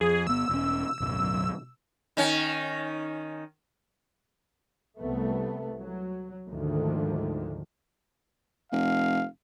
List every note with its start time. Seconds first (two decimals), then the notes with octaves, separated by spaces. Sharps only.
0.01 F2 G#4
0.27 G1 B3 E6
0.49 E1 C#4
1.00 D1 B1 F#2
2.17 D#3 C#4
4.99 C2 A3 B3
5.79 F#3
6.49 D2 G#2 D3 D#3 F3
8.72 F1 F5